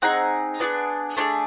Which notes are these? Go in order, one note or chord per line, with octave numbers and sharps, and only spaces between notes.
C4 D#4 G#4 F#5
B3 D4 F4 G#4
A3 D4 F4 G#4